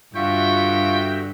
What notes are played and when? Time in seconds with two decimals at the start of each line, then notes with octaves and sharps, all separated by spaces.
0.15 G2 D3 F4 F#4 E5 G5 C#6